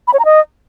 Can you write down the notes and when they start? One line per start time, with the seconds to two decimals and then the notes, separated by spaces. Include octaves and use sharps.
0.07 B5
0.13 C#5
0.19 A#5
0.25 D#5